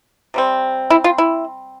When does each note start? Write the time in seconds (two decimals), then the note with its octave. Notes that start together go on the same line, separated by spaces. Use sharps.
0.34 C3 G3 C4
0.90 E4
1.04 F4
1.18 E4